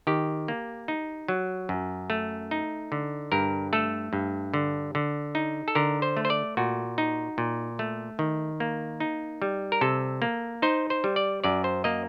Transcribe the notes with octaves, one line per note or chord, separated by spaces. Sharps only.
D#3 G4
A#3
D#4
F#3
F#2
A3
D#4
D3
G2 A#4
A3 A4
G2
D3
D3
D#4
A4
D3 A#4
C5
A3
C5
D5
A#2 F#4
D#4
A#2
A3
D#3
A#3
D#4
G3
A#4
C3 A4
A#3
D#4 C5
C5
G3
D5
F#2 D5
C5
A#3 D#5